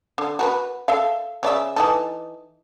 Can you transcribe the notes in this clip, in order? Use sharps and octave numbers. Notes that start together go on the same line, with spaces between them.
D3
F#4 A#4 B4
A4 E5 F5
C#3 D5 E5
E3 D#4 A4